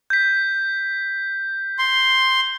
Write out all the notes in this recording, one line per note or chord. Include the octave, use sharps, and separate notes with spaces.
G6 B6
C6